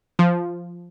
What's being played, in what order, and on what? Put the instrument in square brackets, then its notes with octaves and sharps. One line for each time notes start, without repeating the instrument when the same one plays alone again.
[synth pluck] F3